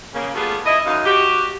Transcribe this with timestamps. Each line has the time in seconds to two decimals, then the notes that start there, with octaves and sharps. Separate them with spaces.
0.14 C#3 A#3
0.34 G3 A3 B3 F4 G4 G#4
0.65 E4 D#5
0.85 F#2 D#4 F5
1.06 F#4 G4